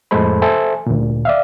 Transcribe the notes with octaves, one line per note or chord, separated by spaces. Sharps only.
F2 A2 G#3 A4 C5 B5
A4 C5 E5 G#5
D2 A#2
D5 E5 F5